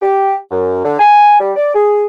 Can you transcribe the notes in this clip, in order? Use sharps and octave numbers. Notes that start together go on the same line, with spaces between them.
G4
F#2
D3
G#5
G3
D5
G#4